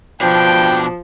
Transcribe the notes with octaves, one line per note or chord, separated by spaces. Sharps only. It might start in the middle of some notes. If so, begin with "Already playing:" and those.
B2 F3 D4 G5